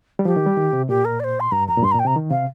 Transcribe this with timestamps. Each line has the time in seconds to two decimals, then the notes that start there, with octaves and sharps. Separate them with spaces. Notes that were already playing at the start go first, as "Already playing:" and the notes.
0.19 G3
0.25 F3 G4
0.36 D#3
0.46 G3
0.57 D#3
0.73 C3
0.89 A#2 G4
1.05 A#4
1.20 D5
1.24 C5
1.40 C6
1.52 G2 A#5
1.68 F2 A#5
1.78 A#2
1.83 G2 C6
1.92 A#2 A#5
1.99 G5
2.05 C3 A#5
2.16 D#3
2.31 C3 F5